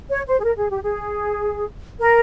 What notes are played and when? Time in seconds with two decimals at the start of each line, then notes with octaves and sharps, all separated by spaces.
0.09 C#5
0.27 C5
0.39 G#4
0.44 A#4
0.57 G#4
0.70 G4
0.83 G#4
2.00 A#4